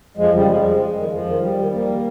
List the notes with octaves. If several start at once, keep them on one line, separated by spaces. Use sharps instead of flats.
F2 F3 G#3
C#3 F3 G3
F2 F3 G#3
C#3 F3
F2
D#3
F2 F3
D#3
D#2 G3
D#3
D#2 G3 A#3
D#3